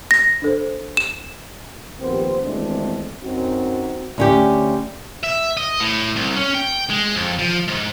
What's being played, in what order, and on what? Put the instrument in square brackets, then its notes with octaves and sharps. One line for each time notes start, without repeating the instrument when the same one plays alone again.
[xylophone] A#6
[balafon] D4 A4 C5
[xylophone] E7
[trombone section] A#1 D#2 B3 C4 G4 C5
G#1 E2 G#3 A3 C4 D4
F#2 C4 D#4 F#4
[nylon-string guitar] D2 C#4 G4
[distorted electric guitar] E5
D#5
A2
C2
C#4
G5
G#3
F2
F3
G#2